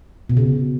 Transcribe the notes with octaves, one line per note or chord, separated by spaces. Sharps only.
B2
C#3